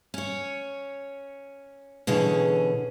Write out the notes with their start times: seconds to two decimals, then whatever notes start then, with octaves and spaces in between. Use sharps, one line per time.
0.14 C#4 C#5
2.07 B2 D3 E3 C#4 G#4